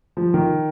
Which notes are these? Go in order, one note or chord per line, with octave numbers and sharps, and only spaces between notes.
F3
D#3